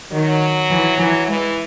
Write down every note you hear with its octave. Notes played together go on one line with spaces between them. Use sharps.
D#3 F#3
E3
E3 F#3
E3 G#3